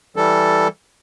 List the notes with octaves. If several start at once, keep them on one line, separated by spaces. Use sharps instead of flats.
E3 G3 A4